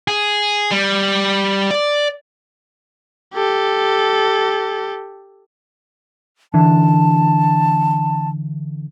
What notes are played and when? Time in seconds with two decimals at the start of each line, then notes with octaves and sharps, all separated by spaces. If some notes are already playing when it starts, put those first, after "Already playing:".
0.08 G#4
0.72 G3
1.71 D5
3.34 G4 A4
6.54 D3 E3 A5